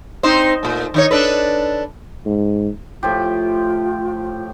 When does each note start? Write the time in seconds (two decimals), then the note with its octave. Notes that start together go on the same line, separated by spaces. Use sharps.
0.23 C4 D#4 C5
0.63 A#2 A3
0.94 D#3 D#4 C#5
1.11 D4 A4 B4
2.26 G#2
3.03 A2 F3 F4 G4